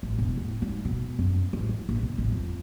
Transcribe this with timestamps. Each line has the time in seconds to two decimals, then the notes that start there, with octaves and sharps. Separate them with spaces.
0.03 A1
0.18 E1
0.37 A2
0.62 G#2
0.85 B2
1.19 F#2
1.53 A1
1.69 E3
1.89 A#1
2.03 E1
2.18 A1
2.32 F2